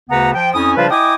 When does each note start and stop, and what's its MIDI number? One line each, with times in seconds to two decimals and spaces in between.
0.09 0.30 38
0.09 0.30 49
0.09 0.30 59
0.09 0.30 71
0.09 0.30 78
0.09 0.30 82
0.34 0.50 53
0.34 0.50 79
0.53 0.74 41
0.53 0.74 61
0.53 0.74 64
0.53 0.74 80
0.53 0.74 87
0.76 0.88 49
0.76 0.88 53
0.76 0.88 55
0.76 0.88 62
0.76 0.88 65
0.76 0.88 71
0.90 1.14 64
0.90 1.14 75
0.90 1.14 79
0.90 1.14 80
0.90 1.14 86
0.90 1.14 87